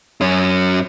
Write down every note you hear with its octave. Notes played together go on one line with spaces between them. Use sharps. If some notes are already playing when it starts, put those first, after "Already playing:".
F#2 C#4